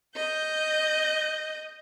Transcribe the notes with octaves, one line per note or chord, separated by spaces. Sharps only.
D#5 G6